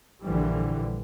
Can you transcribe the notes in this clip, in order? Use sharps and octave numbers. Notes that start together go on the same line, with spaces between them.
A#1 D3 E3 G3